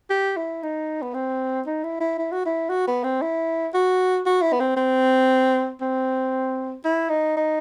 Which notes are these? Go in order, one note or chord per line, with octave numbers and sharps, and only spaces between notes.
G4
E4
D#4
B3
C4
D#4
E4
E4
E4
F#4
E4
F#4
B3
C4
E4
F#4
F#4
E4
B3
C4
C4
C4
E4
D#4
D#4